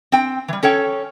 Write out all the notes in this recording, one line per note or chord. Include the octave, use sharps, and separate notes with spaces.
C4 G5
E3 G3
C#4 A4 C#5 G5